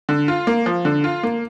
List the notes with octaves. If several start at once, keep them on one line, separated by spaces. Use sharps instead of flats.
D3
F4
A#3
F3
D3
F4
A#3